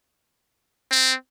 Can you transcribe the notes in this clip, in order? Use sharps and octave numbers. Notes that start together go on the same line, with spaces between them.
C4